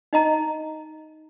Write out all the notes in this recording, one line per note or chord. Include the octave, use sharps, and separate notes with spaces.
D#4 D#5 A#5